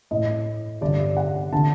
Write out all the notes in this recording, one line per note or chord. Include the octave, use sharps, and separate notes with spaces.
A2 D#5
G2 D3 D5
F#5
D3 A5